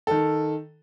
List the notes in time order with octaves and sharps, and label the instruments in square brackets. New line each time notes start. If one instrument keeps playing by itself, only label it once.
[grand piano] D#3 A4